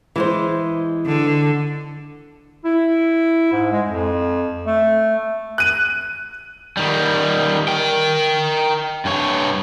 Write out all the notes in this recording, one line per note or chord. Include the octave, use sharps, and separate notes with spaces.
E3 G#3 C5
D3
E4
G#2
G#3
F2
A3
F#6 D#7
D#3 G3
A#4 G5
G2 C#5